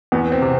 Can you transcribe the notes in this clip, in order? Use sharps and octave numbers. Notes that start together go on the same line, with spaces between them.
E2 B3
C4
C3